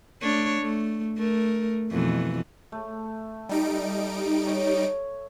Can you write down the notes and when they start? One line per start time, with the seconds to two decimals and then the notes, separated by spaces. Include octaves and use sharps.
0.22 A3 D4 C#5
0.61 A3
1.17 A3 A#4
1.92 F2 B2 E3
2.72 A3
3.49 G3 D#4 D7
4.47 C#5